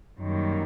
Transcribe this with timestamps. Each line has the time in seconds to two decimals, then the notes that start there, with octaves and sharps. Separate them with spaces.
0.21 F#2 D#3 G3 A#3